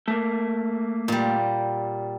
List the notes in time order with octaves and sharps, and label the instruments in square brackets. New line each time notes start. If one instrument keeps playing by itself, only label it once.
[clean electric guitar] A3 A#3
[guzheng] A#2 G3